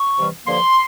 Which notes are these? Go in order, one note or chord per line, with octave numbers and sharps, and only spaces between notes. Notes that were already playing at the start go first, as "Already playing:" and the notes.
Already playing: C#6
C3 E3 G3
G2 D3 F3 A#3 C6